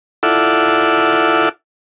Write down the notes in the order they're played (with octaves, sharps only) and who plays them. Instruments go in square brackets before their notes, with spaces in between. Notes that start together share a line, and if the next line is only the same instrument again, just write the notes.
[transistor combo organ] E4 F4 A4 D5 E5 F#5